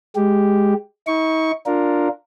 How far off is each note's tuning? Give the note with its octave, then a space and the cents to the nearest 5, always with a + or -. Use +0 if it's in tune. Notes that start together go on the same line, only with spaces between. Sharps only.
G#3 +0 G4 +0
D#4 +45 C#6 +0
D4 +0 F4 +15 A#4 +0